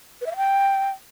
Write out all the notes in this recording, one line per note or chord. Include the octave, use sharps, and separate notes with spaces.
B4
E5
F5
G5